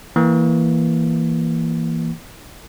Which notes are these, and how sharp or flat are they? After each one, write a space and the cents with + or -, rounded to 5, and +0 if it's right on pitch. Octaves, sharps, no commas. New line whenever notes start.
E3 +0 A#3 +0